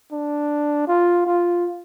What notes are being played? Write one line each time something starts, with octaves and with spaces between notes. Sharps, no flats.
D4
F4
F4